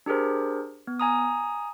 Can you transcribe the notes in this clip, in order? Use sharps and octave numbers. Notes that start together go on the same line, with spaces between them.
D4 G4 G#4 A#4 C5
B3
G#5 A#5 D#6